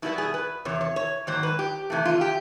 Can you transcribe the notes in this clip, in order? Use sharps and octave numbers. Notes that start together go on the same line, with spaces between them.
B2 G3 B3 E4
G#4
B4
E2 C3 C#5
C#5
C#5
G#2 D#3 F#3 A#3 C5
B4
G4
C3 E3 A3
F4
G4